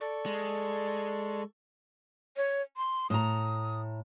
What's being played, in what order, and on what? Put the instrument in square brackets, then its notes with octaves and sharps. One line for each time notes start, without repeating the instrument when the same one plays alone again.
[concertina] A4 C#6 [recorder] D5
[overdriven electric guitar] G#3
[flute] C#5
C6
[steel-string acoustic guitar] A2 A#5 [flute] D#6